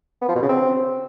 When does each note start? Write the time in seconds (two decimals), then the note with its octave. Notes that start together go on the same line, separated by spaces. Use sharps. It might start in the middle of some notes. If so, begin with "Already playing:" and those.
0.22 B3
0.29 F3
0.35 B2
0.42 C#3
0.49 C4